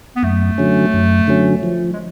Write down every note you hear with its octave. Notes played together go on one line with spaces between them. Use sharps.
B3
F#2 A3
D3 F#3 C#4
F#2
D3 F#3 C#4
F3
G#3